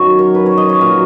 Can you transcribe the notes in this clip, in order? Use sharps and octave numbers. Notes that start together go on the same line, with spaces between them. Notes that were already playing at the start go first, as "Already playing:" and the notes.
Already playing: F#2 D#3 F#3 C#5
A#4
B4
C#5
D#5
C#5
A#2 A#4
F#3